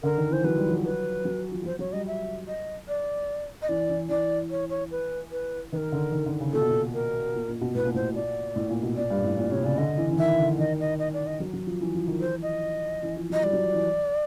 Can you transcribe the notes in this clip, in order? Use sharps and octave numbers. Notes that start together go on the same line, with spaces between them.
D3 A#4
D#3
E3 C5
F#3 B4
G3
F3
F#3
B4
F#3
F3
F3
F#3 C5
F#3 C#5
G3 D#5
E5
D#5
D5
D#5
E3 D5
E3
E3 D5
C#5
C#5
B4
B4
D#3 A#4 B4
D3
D#3
D3
C#3
A#2 A4
B2
A#2
A#4
A#2
A#2
B2
A2 B4
A#2
A2 C5
A#2 D5
A2
A#2
B2
A#2 D5
G2
A2
A#2
C3 C#5
C#3 D5
D3 D#5
E3
E3
D#3 E5
D3
D#3 D#5
D#5
D#5
D5
D#5
F#3
F#3
F3
E3
F3
D#3
E3 C5
D#5
E3
F3
F#3 D#5
G3 D5
F#3
E3